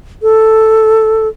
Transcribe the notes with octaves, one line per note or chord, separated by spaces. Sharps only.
A4